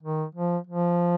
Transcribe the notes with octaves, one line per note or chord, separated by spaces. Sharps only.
D#3
F3
F3